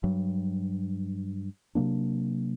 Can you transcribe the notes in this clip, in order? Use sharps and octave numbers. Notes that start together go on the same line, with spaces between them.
G2 F#3
C3 F#3 A#3 D4